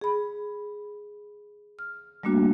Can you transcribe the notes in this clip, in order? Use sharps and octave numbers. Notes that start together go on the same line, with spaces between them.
G#4 B5
F6
G3 A3 A#3 D4 F#4